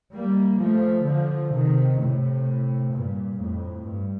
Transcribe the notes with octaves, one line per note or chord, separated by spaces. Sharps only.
G3 A#3
F3 A3
D3 F3
C3 D#3
A2 C3
G2 A#2
F2 A2
G2